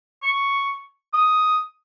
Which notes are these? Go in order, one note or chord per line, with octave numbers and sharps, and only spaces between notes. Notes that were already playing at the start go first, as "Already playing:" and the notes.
C#6
D#6